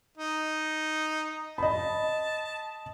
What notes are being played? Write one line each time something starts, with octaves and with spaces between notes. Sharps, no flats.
D#4
D#5 A5 B5